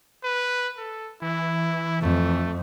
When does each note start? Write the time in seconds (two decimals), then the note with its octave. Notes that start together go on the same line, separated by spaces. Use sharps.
0.24 B4
0.78 A4
1.22 E3 E4
2.02 F2 A3